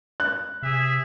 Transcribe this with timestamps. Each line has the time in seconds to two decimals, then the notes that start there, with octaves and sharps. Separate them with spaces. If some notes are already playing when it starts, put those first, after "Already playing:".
0.20 F#6
0.62 C3 G#4 E5